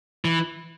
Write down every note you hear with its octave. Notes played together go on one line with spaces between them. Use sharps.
E3